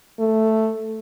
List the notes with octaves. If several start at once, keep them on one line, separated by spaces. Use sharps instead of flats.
A3